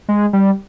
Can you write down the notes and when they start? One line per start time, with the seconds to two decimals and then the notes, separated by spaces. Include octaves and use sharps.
0.08 G#3
0.33 G3